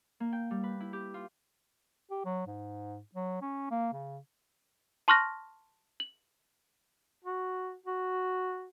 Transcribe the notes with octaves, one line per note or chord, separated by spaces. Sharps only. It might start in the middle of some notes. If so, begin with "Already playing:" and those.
A#3
G5
G3
B4
E4
G4
F4
G4
F#3
G#2
F#3
C#4
A#3
C#3
A5 C6 C#6 F6 F#6 A#6
F#7
F#4
F#4